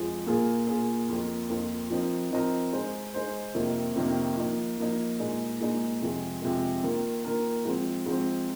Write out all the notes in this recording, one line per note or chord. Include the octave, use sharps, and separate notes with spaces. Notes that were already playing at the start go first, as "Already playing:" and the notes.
Already playing: F2 F3 G#3
A#2 A#3 F4 G#4
A#2 A#3 F4 G#4
F2 F3 A#3 F4
F2 F3 A#3 F4
F3 C4 D#4 A#4 D#5
F3 C4 D#4 A#4 D#5
G#3 D#4 C5
G#3 D#4 C5
F2 C3 D#3 A#3
F2 C3 D#3 A#3
F3 A#3 D#4
F3 A#3 D#4
A#2 G#3 D#4
A#2 G#3 D#4
F2 C3 F3 G#3
F2 C3 F3 G#3
D#3 A#3 F4 A#4
D#3 A#3 F4 A#4
G#2 F3 C4
G#2 F3 C4